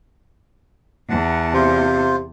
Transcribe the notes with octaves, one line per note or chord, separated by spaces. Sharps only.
E2 F#5 A5
C3 F4 C5